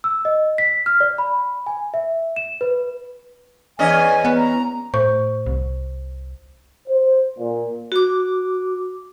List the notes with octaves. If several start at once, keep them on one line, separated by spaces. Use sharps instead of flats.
E6
D#5
B6
F6
D5
B5
G#5
E5
E7
B4
E2 C#4 D#5 G#5
B3
A#5
A2 C5 C#6
C2
C5
A#2
F#4 D6